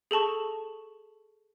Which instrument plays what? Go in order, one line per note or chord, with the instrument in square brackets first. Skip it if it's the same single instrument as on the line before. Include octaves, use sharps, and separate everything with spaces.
[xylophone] G#4 A4 A5 C#6